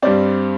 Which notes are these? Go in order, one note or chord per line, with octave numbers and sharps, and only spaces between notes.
G2 G3 C4 D5